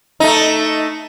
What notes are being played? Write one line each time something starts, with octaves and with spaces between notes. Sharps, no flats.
A3 D#4